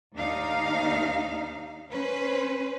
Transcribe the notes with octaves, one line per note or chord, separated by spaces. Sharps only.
D#2 D4 D#4 F5
C#4 B4 C5